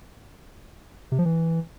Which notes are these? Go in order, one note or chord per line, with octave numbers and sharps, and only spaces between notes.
C3
F3
E3